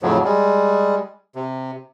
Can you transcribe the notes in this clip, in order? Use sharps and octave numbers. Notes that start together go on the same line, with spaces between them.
F2 A2 C#3 F3 F#3
G3 G#3
C3